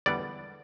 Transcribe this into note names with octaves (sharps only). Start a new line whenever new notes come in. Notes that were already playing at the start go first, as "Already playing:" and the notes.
E2 D3 G3 B3 D5